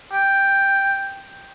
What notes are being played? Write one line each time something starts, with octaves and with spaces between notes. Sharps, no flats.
G5